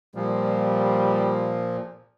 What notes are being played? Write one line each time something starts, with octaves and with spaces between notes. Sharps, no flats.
A#2 F3 G3